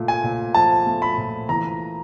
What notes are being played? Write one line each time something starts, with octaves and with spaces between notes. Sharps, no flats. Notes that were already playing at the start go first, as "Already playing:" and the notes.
Already playing: A#2 A3
G#5
A#2
F3 A5
A3
B5
A#2
E3 A#5